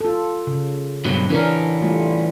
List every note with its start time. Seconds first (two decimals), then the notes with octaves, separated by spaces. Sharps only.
0.01 F4 A4
0.47 C#3
1.05 G2 B2 F#3
1.30 E3 C#4 D4 A#4
1.82 G3 A3 F4